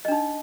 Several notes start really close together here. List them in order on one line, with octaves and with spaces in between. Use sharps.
D#5 D4 D#4